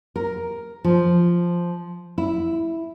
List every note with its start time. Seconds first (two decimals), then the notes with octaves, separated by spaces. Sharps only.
0.16 A#4
0.84 F3
2.18 E4